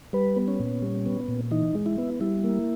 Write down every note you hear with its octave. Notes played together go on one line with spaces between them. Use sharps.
G3 B4
B3
C#4
A#2
G3
B3
A#2
E3 D#4
G#3
E4
B3
G3 E4
A#3